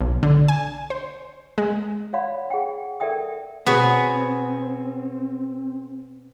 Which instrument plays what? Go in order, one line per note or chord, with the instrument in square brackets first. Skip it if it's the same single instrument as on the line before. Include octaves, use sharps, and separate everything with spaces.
[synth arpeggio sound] B1
D3
G#5
C5
G#3
[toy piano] C#5 D5 F5 F#5 B5
G#4 F#5 G5
A4 A#4 D5 E5 G5 D#6
[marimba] B2 [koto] B3 [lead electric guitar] C4 [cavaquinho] F#4 G#4 C#5